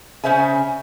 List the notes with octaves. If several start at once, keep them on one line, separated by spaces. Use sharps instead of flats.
C#3 C#4 C5 E5 G#5